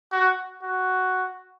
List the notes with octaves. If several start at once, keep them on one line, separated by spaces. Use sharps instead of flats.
F#4
F#4